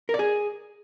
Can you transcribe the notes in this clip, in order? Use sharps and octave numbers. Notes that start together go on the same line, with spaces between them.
A#4
D5
G#4